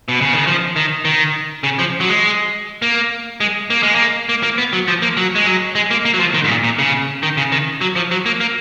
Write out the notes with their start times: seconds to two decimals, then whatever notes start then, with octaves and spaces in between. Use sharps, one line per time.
0.08 B2
0.21 C#3
0.34 D#3
0.47 F3
0.76 D#3
1.05 D#3
1.64 C#3
1.79 F3
2.01 F#3
2.09 G#3
2.82 A#3
3.40 G#3
3.70 A#3
3.83 G#3
3.95 A#3
4.29 A#3
4.43 A#3
4.58 B3
4.73 F#3
4.88 F3
5.02 A#3
5.17 F#3
5.35 G#3
5.46 F#3
5.75 G#3
5.91 A#3
6.05 A#3
6.14 F#3
6.20 F3
6.34 D#3
6.44 G#2
6.49 A#2
6.64 A#2
6.79 C#3
7.23 D#3
7.37 C#3
7.52 D#3
7.81 F#3
7.96 F3
8.11 F#3
8.26 A#3
8.40 A#3